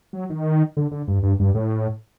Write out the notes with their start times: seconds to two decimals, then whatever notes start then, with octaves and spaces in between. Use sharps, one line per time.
0.13 F#3
0.30 D#3
0.77 D3
0.91 D3
1.08 G2
1.23 G2
1.39 G2
1.55 A2